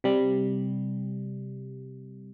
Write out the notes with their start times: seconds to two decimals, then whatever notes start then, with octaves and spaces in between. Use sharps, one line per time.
0.04 C3 G3